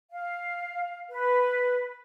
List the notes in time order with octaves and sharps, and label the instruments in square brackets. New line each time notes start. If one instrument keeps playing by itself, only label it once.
[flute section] F5
B4